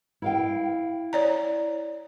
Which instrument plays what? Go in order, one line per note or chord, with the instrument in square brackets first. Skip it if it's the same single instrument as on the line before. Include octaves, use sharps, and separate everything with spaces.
[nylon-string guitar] E4 F5 G5
[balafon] C#5 D5 A#5